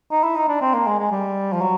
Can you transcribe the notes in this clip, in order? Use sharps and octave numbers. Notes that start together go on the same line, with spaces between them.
D#4
E4
D#4
D4
C4
A#3
G#3
G#3
G3
F3
F#3